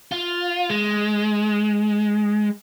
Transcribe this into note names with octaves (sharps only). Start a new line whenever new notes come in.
F4
G#3